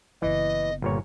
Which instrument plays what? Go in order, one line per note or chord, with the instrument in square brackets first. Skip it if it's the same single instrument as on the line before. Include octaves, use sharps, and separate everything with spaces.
[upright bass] F#1 B3 [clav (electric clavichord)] E3 [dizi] D#5
[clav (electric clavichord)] G1 A#2 C#5